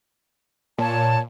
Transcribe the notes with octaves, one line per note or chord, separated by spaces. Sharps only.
A#2 C#5 A5